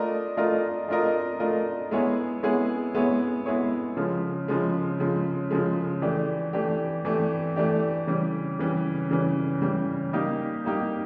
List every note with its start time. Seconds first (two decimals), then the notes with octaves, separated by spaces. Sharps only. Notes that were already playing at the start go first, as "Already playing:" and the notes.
Already playing: A3 D4 F4 A#4 D#5
0.37 A3 D4 F4 A#4 D#5
0.88 A3 D4 F4 A#4 D#5
1.40 A3 D4 F4 A#4 D#5
1.91 G#3 B3 E4 G#4 C#5
2.43 G#3 B3 E4 G#4 C#5
2.95 G#3 B3 E4 G#4 C#5
3.46 G#3 B3 E4 G#4 C#5
3.97 C#3 F3 G#3
4.48 C#3 F3 G#3
5.00 C#3 F3 G#3
5.51 C#3 F3 G#3
6.02 E3 A3 D4 G4
6.53 E3 A3 D4 G4
7.05 E3 A3 D4 G4
7.56 E3 A3 D4 G4
8.07 C#3 E3 G3
8.59 C#3 E3 G3
9.11 C#3 E3 G3
9.62 C#3 E3 G3
10.13 G3 A#3 D#4 G4
10.64 G3 A#3 D#4 G4